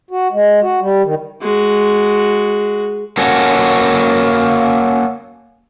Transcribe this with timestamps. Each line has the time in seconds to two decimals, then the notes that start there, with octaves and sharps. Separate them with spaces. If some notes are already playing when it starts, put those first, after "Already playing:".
0.11 F#4
0.32 G#3
0.62 F#4
0.81 G3
1.03 D#3
1.41 G#3 F#4
3.17 A#3 C#4 F#4 A4